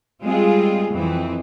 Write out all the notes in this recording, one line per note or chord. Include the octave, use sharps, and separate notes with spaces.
G3 G#3 C4 F4 G#4
F2 E3 C4